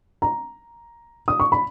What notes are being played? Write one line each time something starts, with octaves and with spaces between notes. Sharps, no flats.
A#5
D#6
C#6
B5